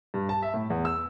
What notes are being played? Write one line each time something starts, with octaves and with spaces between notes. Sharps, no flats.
G2
A5
E5
A2
E2
E6